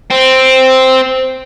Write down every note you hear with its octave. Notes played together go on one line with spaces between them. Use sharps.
C4